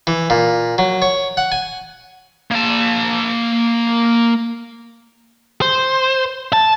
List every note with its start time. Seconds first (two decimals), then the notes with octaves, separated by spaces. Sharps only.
0.07 E3
0.30 A#2
0.78 F#3
1.02 C#5
1.37 F#5
1.52 G#5
2.51 A#3 A5
5.62 C5
6.53 A5